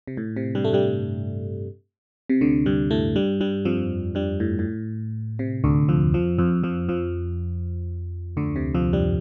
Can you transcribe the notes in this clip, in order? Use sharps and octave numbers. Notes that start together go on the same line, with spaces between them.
C3
A2
C3
G2 G3
A3
G2 G3
C3
D2 D3
G2 G3
A2 A3
G2 G3
G2 G3
F2 F3
G2 G3
A2
A2
C3
D2 D3
F2 F3
F2 F3
F2 F3
F2 F3
F2 F3
D2 D3
C3
F2 F3
G2 G3